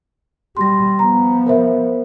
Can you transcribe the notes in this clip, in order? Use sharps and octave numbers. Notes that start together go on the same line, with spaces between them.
G3 C6 A#6
F3 B3 A#5
A#4 C5 E5